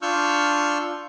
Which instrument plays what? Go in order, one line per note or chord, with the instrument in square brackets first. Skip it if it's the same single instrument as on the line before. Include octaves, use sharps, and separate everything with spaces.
[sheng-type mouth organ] D4 F4 C#6 E6 F6 G6